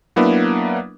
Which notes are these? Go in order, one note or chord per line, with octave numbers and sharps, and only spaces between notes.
F#3 A#3 B3 D4 E4